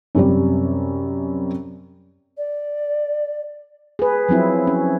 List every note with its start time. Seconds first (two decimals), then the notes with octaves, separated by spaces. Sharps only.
0.15 F#2 C3 G3 D5
2.37 D5
3.99 G#4 B4
4.29 F3 F#3 C4 E4
4.67 C#4